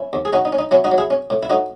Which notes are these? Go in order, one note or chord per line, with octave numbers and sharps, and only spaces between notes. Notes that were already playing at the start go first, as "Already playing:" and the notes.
Already playing: C#4 E4
D#2
G#4
C#4 D#4 F#4
D#4
C#4
D#4
F#3 C#4 E4
D#4 F#4
F#3
E4 G#4
C#4
A2
E4
A2 D#4 F#4